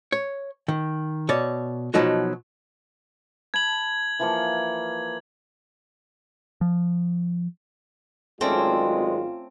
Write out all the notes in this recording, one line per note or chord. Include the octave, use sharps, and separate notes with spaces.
C#5
D#3
B2 C#5 D5
B2 F3 F#3 D#4 F#4
A5 B5 G#6 F#7
E3 F3 A#3
F3
G#1 F#3 G#3 A3 C4 C#4 F4 D5